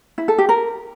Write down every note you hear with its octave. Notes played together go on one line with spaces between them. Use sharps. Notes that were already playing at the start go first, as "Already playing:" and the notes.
E4
A4
G4
A#4